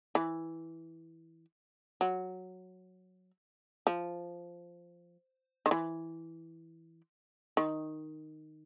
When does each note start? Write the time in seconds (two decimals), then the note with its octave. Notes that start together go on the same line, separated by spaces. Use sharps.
0.15 E3
2.01 F#3
3.87 F3
5.66 D#3
5.71 E3
7.57 D#3